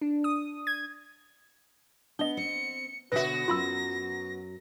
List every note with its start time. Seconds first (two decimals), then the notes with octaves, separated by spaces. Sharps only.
0.01 D4
0.24 D#6
0.67 G#6
2.19 B3 D4 D#5 G7
2.37 C4 C#7
3.12 B2 D3 B3 F#4 B4 C#5 E5 A#6
3.48 F#2 F#3 F4 B5 E6